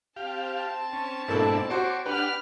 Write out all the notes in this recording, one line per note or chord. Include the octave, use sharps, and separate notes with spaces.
C4 G4 F5 A5
C#4
G#2 B2 A#3 D4 E4 A4
F#4 C5 C#5 C6 D6
D4 G4 B4 F#5 B5 F6